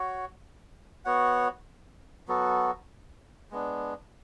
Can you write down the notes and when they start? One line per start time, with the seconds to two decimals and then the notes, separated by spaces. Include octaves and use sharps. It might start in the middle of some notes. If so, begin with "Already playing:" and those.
Already playing: F#4 C#5
1.05 B3 F#4 C#5 F#5
2.28 F#3 B3 F#4 A4
3.51 G#3 B3 D4